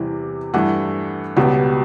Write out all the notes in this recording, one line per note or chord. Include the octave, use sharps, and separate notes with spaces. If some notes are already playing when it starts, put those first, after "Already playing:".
Already playing: E2 C3 E3 G3
G2 E3 A3 F#5
C#2 B2 G3 B3